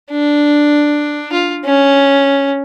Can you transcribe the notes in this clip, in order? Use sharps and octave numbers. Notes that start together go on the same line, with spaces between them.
D4
F4
C#4